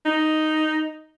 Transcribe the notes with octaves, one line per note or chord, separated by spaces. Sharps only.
D#4